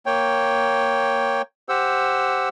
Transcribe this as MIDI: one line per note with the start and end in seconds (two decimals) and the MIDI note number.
0.06 1.42 58
0.06 1.42 73
0.06 1.42 79
1.69 2.49 67
1.69 2.49 72
1.69 2.49 78
1.69 2.49 88